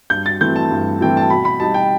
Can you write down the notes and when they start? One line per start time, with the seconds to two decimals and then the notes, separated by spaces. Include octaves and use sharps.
0.10 G2 G6
0.26 A6
0.41 E3 A3 C4 E4 G6
0.56 A5
0.71 G2
1.01 E3 A3 C4 E4 G5
1.17 A5
1.30 B2 B5
1.45 B5
1.60 G3 D#4 A5
1.74 G5